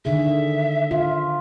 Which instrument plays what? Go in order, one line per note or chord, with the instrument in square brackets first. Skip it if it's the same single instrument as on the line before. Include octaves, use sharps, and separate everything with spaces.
[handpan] D3 D#3 G#4 [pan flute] E5
[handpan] F4